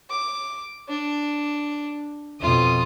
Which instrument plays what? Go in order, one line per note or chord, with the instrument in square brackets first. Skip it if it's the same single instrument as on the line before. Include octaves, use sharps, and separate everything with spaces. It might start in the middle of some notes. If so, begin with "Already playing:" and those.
[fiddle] D6
D4
[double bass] F2 B2 [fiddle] F4 D#6